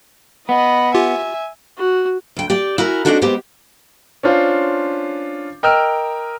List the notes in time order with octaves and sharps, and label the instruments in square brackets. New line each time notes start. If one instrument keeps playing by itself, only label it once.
[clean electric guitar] B3 [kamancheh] D#5 B5
[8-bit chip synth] F4 G4 [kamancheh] E5 G#5
[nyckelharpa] F#4
[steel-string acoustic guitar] D2 G5
G4 D5
E4 F#4 A#4 G#5
G#3 C4 D4 D#4 F#4 A4
G#3 B3 C4 G4 C5
[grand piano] C#4 D4 F4 C5
A#4 D#5 G5 E6 F6